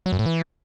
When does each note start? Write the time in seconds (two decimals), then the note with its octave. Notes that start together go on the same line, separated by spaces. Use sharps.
0.06 F#3
0.12 F#2
0.19 A2
0.26 E3